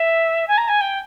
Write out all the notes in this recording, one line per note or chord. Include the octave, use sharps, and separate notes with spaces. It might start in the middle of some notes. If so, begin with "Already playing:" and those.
Already playing: E5
G#5
A#5
G#5
G5